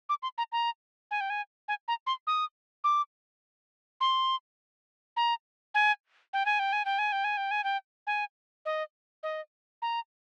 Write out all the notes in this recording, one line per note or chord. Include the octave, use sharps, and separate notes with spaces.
D6
C6
A#5
A#5
G#5
G5
G#5
G#5
A#5
C6
D#6
D6
C6
A#5
G#5
G5
G#5
G5
G#5
G5
G#5
G5
G#5
G5
G#5
G5
G#5
D#5
D#5
A#5